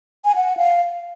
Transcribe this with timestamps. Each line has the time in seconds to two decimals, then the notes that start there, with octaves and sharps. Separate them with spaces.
0.25 G#5
0.35 F#5
0.57 F5